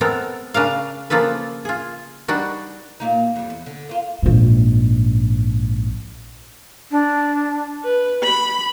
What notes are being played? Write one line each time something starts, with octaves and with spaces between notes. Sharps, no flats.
G#3 B3 C4 A4 A#4
C#3 D4 A#4 F5
C#3 F3 A#3 F4 A4 B4
F4 G#4
G3 D4 D#4 F#4
A#2 A#3 D#4
F2 G3
E2
D3
A#3 F4
A#1 G#2
D4
B4
B5